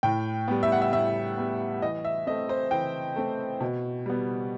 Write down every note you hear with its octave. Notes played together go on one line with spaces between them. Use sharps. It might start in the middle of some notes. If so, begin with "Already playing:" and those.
A2 G5
G3 B3
E5
F#5
E5
A2 E5
G3 B3
E3 D#5
E5
A3 C4 D#5
C5
E3 G5
A3 C4
B2
G3 B3